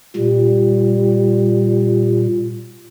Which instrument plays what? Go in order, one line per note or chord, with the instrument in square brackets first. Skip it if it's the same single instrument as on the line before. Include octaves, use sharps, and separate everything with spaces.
[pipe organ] A#2 [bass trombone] G3